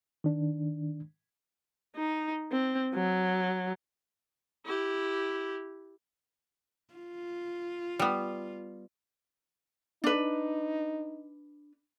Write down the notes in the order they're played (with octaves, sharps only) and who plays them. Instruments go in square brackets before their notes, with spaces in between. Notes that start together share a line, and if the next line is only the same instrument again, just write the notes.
[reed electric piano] D#3 D4
[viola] D#4
C4
F#3
E4 G4
[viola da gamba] F4
[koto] G3 B3
[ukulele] D4 B4 [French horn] D#4